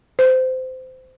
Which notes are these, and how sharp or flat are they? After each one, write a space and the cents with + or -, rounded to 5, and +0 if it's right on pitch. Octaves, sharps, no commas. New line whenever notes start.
C5 -20